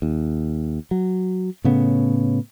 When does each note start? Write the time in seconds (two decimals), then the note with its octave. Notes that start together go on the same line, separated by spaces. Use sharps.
0.02 D#2
0.91 F#3
1.64 A2 C#3 B3